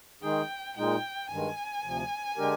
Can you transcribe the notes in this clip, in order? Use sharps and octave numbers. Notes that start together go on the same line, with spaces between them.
D#3 G#3 D#4 G#4 G5
A#2 G#3 D#4 G5
G2 D#3 G#3 G#5
D2 C3 F3
D3 G#3 D4 G4 A#4